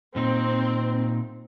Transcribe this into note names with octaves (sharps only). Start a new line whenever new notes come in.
A#2 C4 D#4